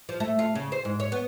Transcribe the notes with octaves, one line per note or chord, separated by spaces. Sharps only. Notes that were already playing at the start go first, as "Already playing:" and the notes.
F3
A3
F4
C#3
C5
G#2
C#5
B3